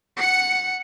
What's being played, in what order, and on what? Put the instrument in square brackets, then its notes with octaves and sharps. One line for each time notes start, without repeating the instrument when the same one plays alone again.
[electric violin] F#5 C#7